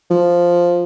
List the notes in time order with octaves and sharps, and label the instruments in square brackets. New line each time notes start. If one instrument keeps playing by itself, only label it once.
[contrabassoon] F3